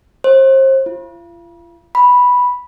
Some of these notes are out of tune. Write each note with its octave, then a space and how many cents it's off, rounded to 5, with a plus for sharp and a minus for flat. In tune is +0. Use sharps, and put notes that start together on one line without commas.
C5 +35
F4 -40
B5 -5